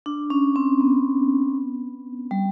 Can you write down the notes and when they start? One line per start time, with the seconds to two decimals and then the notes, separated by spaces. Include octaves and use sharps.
0.06 D4
0.30 C#4
0.56 C4
0.81 B3
2.31 G3